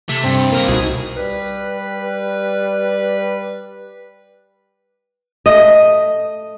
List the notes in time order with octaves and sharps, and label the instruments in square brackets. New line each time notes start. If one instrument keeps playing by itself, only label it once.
[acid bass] C3 [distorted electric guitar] A3
[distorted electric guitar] G2 [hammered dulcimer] C4
[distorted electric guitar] E3 A#4 [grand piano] A#3
[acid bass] C2 [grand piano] B2 D#4 [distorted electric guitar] G#4
[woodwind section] G3 B4
[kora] A3 D#5